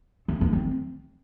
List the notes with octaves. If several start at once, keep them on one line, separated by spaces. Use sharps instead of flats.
C4
B3
C4